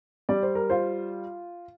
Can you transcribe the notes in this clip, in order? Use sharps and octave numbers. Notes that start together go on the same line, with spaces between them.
G3 D5
C5
A#4
F4 C5